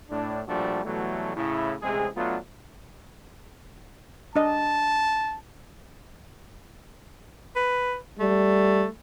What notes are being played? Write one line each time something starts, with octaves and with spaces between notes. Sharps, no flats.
A2 D4
A#2 F3 G3 A3 D4 F#4
B2 E3 F#3 G3 A3
A2 C#3 E4
A1 C3 G#3 C4 G#4
F#3 A3 B3 D4 F4
D4 D#5 A5
B4
G3 A3